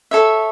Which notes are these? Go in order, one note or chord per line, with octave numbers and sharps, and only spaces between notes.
A4 C#5 E5